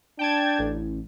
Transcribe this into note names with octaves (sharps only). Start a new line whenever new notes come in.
D4 G5 A5 G#6
A1